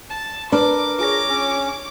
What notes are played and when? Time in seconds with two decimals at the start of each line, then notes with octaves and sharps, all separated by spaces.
0.10 A5
0.52 D4 A#4 B4 D6
0.99 F4 G#4 C#5 D6 A#6
1.29 C#4